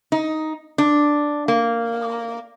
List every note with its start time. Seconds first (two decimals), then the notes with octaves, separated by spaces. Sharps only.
0.12 D#4
0.78 D4
1.48 A#3